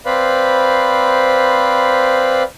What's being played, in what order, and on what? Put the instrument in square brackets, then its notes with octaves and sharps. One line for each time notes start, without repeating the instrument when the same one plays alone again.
[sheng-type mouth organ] C4 B4 C5 D5 F5 B5